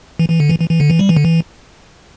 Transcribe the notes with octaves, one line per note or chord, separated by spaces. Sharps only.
E3
E3
D3
E3
E3
E3
D3
E3
G3
E3
D3
E3